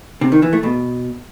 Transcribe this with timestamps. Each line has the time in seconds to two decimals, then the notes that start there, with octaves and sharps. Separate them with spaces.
0.21 C3
0.32 D#3
0.42 E3
0.53 A3
0.63 B2